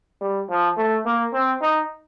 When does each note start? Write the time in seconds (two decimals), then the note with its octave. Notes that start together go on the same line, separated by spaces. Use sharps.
0.21 G3
0.49 F3
0.77 A3
1.06 A#3
1.33 C4
1.61 D#4